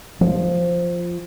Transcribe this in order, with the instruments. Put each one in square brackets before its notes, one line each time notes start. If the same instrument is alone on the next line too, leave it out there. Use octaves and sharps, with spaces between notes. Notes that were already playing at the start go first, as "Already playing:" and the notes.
[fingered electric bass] F3